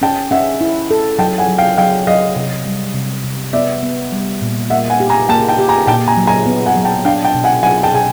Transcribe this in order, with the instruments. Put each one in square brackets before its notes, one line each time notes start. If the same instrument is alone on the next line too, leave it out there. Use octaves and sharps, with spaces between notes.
[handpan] C#4 [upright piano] G5 A5
[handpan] C#4 [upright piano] E5 F#5
[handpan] E4
A4
[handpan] F#3 [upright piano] G5 A5
[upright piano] F#5 G#5
[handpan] F#3
[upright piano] F5 G5
[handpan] F#3 [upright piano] F5 G5
[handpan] F#3 [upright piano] D#5 F5
[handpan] C3
G3
C3
C3
[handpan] B3 [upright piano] D5 E5
[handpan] B3
G3
A#2
[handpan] A#3 [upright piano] E5 F#5
[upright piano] F#5 G#5
[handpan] G4
[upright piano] G#5 A#5
[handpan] A#3 [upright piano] G5 A5
[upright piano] G5 A5
[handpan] G4
[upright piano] G#5 A#5
[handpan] A#2 [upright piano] G5 A5
[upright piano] G#5 A#5
[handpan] F#3
[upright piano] G#5 A#5
[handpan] B3
[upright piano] F#5 G#5
[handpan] F#3
[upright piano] G5 A5
[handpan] D4 [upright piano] F5 G5
[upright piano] G5 A5
[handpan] B2
[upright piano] F#5 G#5
[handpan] F#3 [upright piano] F#5 G#5
[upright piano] G5 A5
[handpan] B2 [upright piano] G#5